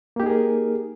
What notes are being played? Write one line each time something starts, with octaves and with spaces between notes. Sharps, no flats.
A#3 D#4 G4 G#4 A#4